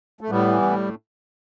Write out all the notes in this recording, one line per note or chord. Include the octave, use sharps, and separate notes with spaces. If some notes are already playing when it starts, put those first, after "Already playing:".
A3
A2 G3 B3
E3
A2